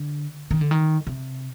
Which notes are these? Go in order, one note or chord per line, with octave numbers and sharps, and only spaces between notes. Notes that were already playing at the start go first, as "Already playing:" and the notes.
Already playing: D3
D#3
D3
D#3
C3